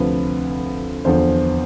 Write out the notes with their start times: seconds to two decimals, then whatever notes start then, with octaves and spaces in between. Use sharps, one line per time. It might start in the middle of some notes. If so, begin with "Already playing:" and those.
Already playing: D2 C3 F3 B4
1.05 E2 D3 F3 C5